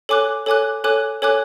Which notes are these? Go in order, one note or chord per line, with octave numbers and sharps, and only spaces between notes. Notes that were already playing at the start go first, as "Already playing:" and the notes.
A4 C#5 G#5 D6 F#6
A4 C#5 G#5 D6 F#6
A4 C#5 G#5 D6 F#6
A4 C#5 G#5 D6 F#6